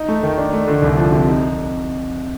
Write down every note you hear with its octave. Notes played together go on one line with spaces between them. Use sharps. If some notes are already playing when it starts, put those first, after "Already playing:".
Already playing: D#4
A3
D#3
D4
A3
D3
C2
F3
C3
D#4